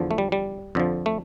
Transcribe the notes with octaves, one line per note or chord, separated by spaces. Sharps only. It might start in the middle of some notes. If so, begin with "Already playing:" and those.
Already playing: E2 D3 F3
A3
G3
G3
F2 D3 F3
A3